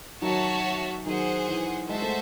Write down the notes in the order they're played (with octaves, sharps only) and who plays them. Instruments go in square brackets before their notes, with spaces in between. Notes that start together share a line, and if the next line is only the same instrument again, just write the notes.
[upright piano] D#3 F#3 [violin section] F#4 C#5 E5 A5
[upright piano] D#3 F#3 [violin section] G#4 C5 F#5
[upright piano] E3
[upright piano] G#3 [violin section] F#4 C5 E5 A5
[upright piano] A3